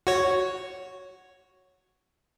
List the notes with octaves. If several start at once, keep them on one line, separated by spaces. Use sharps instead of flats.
F#4 C#5